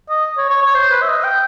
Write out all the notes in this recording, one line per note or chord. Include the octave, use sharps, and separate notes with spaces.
D#5
C#5
C#5
C#5
C5
B4
E5
D#5
G5